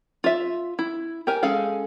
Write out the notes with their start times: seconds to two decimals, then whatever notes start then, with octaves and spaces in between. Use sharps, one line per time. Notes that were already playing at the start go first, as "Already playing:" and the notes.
0.24 F4 E5
0.79 E4
1.27 G4 A#4 G#5
1.43 G#3 C#4 G#4 A4 F5